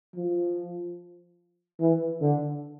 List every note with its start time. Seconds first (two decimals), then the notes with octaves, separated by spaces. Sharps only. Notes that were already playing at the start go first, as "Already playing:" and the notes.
0.16 F3
1.80 E3
2.21 D3